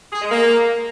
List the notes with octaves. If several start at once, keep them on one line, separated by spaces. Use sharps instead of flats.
G#4
G#3
A#3